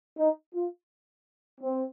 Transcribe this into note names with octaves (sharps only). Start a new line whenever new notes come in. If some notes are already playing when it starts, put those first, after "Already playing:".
D#4
F4
C4